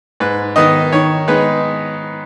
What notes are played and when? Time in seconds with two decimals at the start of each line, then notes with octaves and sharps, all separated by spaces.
0.20 G#2 B4
0.56 D#3 B3 D#4 D#5
0.92 D#3 C#5
1.28 G#3 B3 D#4 B4